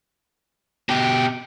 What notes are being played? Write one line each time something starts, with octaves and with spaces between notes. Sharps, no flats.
B2 G4